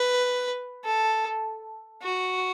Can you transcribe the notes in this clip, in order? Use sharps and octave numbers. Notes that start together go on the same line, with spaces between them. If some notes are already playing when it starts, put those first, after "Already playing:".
Already playing: B4
A4
F#4